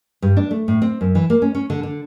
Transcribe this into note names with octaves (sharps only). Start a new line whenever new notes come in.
G2
D4
A3
A2
C4
F#2
E3
A#3
C#4
C#4
D3
D3